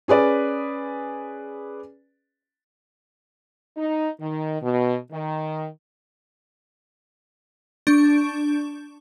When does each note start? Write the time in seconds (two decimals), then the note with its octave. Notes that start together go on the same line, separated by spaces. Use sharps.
0.08 C#4 G#4 B4 D5
3.76 D#4
4.20 D#3
4.62 B2
5.11 D#3
7.87 D4 C#6 G6